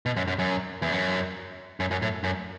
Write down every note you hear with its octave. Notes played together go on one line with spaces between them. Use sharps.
B2
F#2
F#2
F#2
E2
F#2
F#2
F#2
A2
F#2